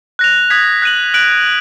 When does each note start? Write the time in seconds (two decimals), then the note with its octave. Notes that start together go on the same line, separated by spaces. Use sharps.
0.19 F#6 A#6 F7
0.50 D#6 G#6 B6
0.82 F#6 B6 D#7 F#7
1.14 F#6 D7 F#7